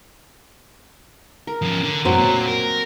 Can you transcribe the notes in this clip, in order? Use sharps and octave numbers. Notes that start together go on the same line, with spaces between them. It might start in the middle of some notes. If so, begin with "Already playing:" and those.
A#4
F3 C#4
D3
F#2 A2 F#3 C4
A#2 A#3
A#4